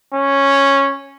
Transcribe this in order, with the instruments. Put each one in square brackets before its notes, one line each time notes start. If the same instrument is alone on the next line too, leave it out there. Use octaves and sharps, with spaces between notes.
[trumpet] C#4